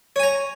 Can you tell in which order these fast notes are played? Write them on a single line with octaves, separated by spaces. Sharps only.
C#5 G#5 A#5